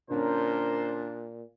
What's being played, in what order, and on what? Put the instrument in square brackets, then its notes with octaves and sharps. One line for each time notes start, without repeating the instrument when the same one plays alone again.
[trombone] A#2 [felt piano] D3 C#4 [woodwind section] D4 [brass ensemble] A#4 C5